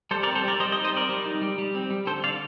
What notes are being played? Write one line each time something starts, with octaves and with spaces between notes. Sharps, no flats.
G3 A4 C5
A#4 D5
C4
A4 C5
G3 A#4 D5
G3 C5 D#5
C5 D#5
D#4
C5 D#5
C4 A#4 D5
G3
D#4
G3
G3
C4
G3
D3 A4 C5
D3 D5 F5